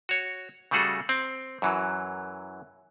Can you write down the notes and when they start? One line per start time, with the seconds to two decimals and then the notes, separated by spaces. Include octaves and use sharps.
0.09 F#4 C#5
0.71 C#3 G3 A3 F#4 G#4 A4
1.09 C4
1.62 F#2 E3 F#3